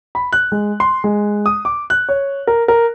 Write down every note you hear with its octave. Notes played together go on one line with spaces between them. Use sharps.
B5
F#6
G#3
C6
G#3
D#6
D6
F#6
C#5
A#4
A#4